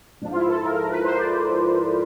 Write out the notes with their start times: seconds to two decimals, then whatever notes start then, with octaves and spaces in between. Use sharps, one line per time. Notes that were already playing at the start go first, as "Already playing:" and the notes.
0.22 G#2 F3 D4
0.31 F4
0.36 E4
0.49 A4
0.63 G#2 F3 A#4
0.76 A#4
0.90 B4
1.04 G#2 F3 C5
1.17 D5